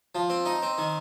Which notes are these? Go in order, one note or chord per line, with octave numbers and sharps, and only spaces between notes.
F3
C4
D#4
C4
D#3